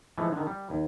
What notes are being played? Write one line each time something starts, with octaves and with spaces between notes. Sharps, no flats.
E3 F3 G#3 A3
D3 D#3
G3
D#2